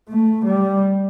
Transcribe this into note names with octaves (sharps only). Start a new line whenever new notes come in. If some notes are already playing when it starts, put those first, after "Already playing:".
A3
G3